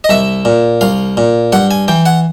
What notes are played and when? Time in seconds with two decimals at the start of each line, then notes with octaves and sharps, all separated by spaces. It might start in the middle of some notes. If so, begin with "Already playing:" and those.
0.04 D#5
0.09 C2 E5
0.45 A#2
0.81 C2 F5
1.17 A#2
1.52 G2 F#5
1.71 G#5
1.88 E3 G5
2.06 F#5